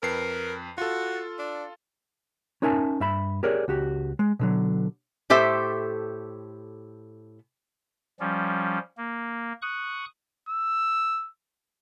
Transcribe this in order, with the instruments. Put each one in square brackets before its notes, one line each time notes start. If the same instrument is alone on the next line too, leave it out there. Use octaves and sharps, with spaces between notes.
[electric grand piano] F2 B4 C7 [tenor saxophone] A#4
[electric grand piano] F4 A4 [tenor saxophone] F#4
[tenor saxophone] D4
[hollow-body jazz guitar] C#4 D#4 A#4 E5 G#5 A5
G2 E5 B5
G4 G#4 A#4 C#5 D5
C#2 F#4 G4
G#3
B2 D3 F#3
[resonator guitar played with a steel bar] A2 G4 A4 C5 E5
[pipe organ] F3 G3 C#4
A#3
C#6 D#6 F#6
[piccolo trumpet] E6